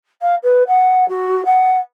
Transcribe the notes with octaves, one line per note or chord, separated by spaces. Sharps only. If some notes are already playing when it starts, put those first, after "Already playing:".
F5
B4
F#5
F#4
F#5